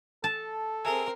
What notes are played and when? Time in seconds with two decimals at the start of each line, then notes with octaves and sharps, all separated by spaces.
0.24 A4 A5
0.85 C4 G#4 A#4 E5 G#5